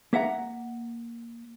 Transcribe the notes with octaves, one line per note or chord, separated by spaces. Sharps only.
A#3 E5 F#5 A#5